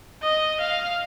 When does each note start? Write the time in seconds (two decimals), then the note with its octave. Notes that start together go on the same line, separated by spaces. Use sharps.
0.23 D#5
0.60 F5